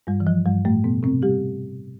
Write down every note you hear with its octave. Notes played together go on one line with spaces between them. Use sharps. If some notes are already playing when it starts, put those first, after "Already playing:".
G2 G3
E3
F3
G2 G3
A2 A3
B2 B3
C3 C4
G3 G4